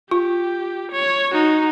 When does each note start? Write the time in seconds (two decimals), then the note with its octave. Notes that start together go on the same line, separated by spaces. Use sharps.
0.11 F4 G4
0.92 C#5
1.33 D#4 F#4